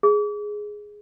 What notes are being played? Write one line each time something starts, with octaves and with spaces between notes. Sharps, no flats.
G#4